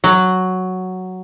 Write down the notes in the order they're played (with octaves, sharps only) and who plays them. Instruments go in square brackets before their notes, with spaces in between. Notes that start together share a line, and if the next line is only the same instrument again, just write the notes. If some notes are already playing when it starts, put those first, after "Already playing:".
[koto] F#3